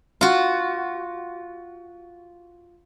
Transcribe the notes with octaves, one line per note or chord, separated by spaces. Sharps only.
F4 F#4